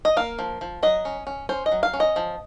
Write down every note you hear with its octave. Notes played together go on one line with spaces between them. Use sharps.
D#5
A#3 F5
F3
F3
F#3 D#5
C#4
C#4
C#4 C5
D#5
F#3
F5
C#4
D#5
F3